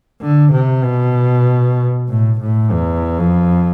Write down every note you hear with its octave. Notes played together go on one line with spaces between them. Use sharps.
D3
C3
B2
A2
A2
E2
F2